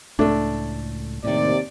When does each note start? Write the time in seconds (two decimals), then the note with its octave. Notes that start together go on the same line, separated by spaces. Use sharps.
0.19 C#2 A2 A3 D4
1.24 D#2 A2 C3 D#3 D5